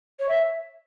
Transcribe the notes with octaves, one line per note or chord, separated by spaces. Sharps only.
C#5
E5